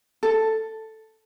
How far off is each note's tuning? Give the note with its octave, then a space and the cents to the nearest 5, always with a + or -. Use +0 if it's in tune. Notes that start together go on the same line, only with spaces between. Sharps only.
A4 +5